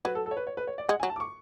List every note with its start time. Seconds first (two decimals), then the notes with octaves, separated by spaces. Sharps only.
0.05 F#3 B4
0.15 A4
0.26 A4
0.31 C#5
0.37 B4
0.47 C#5
0.57 B4
0.67 C#5
0.78 D5
0.89 G#3 F#5
1.00 G#5
1.03 F#3
1.10 A5
1.16 D6
1.20 C#6